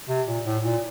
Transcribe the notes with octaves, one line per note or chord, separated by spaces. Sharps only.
C3
A#2
A2
A#2